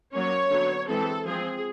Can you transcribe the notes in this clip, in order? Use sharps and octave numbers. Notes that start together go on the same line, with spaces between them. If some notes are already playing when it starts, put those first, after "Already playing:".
F#3 A#3 C#4 C#5
D3 F#3 B3
E3 G#3 C4 A4
F3 G#3 C4 G#4